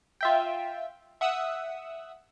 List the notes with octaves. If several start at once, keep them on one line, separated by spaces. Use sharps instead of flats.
F4 E5 G5
E5 F#5 D#6 E6 F#6